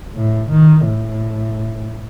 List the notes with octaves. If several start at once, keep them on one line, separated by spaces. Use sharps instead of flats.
A2
D#3
A2